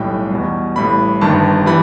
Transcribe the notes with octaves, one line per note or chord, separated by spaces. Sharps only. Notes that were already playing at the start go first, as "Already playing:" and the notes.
Already playing: B1 A2 G3 G5
E2 B2 G3
A1 A2 G3 B5
G1 G2 D#3 G3 A5
E3 G3 B5